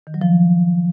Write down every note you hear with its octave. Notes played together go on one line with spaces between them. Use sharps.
D#3
F#3
F3